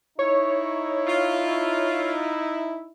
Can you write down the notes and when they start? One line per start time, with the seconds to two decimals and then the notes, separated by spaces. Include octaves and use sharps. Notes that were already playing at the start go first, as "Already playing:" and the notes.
0.19 D#4 E4 C#5
1.07 F4